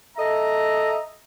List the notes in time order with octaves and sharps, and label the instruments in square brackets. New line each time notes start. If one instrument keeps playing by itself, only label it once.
[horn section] A4 D#5 E5 A#5